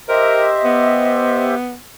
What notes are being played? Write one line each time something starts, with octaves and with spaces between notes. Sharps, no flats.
G4 A#4 C5 D#5 E5
B3